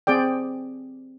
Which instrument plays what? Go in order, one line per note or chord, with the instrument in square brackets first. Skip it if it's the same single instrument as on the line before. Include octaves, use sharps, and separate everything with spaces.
[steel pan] C4 G#4 D5 G5